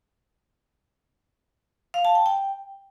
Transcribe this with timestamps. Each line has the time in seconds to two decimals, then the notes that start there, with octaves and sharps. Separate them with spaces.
1.94 F5
2.05 A5
2.15 G5
2.26 G5